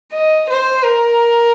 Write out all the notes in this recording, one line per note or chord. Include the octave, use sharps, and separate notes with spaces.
D#5
C5
A#4